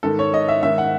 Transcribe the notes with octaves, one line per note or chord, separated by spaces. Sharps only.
G#2 D#3 A4
C#5
D#5
E5
G#2 D#3 E5
F#5